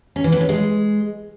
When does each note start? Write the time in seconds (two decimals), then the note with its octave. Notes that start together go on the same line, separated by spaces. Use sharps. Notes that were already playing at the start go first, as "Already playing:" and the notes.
0.16 C#4
0.24 E3
0.32 A2
0.41 C#4
0.49 G#3